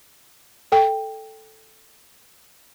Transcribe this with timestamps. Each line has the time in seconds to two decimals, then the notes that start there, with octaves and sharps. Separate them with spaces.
0.72 A4 G5